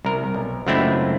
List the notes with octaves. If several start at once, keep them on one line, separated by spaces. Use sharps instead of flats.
C2 A#4
B1
C#2 F#2 A3 C4 D4 E4